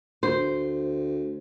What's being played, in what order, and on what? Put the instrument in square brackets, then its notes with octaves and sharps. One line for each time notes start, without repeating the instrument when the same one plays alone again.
[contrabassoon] D2 [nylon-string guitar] C5